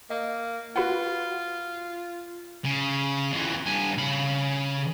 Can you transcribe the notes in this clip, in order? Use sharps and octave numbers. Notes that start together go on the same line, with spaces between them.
A#3 D#5
F4 F#4 B4 F#5
C#3
F2 E3
G2 G#5
C#3 B5